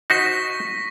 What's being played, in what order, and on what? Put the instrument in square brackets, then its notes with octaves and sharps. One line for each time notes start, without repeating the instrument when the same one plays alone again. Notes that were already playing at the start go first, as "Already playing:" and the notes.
[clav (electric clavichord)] D#4 F#4 C5 [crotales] C#6 A#6 B6